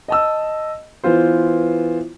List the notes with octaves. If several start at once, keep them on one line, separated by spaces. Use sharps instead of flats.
D#5 A5 E6
E3 B3 F4 C5